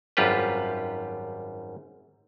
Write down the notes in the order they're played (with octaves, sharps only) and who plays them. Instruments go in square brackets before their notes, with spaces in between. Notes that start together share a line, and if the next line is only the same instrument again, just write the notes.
[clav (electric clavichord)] G#1 F#2 G3 F4 G4 B4